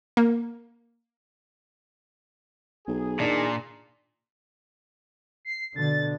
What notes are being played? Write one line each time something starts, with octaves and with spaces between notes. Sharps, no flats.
A#3
B1 G#4
A#2 D#3 D4
C7
B2 D3 A6